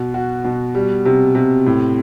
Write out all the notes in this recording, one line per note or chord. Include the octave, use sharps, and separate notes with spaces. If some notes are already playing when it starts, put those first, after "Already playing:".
Already playing: B2
F#4
B2
G3
C3
C3
A2